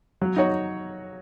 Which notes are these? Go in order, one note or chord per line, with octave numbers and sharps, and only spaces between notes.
F#3
D#4 F#4 C#5